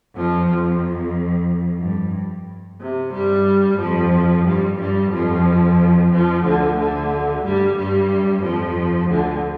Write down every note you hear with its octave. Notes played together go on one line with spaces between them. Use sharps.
F2 F3
F2
G2
C3
G2 G3
F2 F3
G2 G3
G2 G3
F2 F3
F2 F3
D2 D3
D2 D3
G2 G3
G2 G3
F2 F3
D2 D3